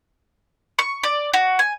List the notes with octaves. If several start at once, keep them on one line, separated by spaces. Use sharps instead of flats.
C#6
D5
F#4
G#5